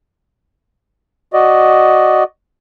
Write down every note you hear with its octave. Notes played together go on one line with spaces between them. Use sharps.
F#4 D5 D#5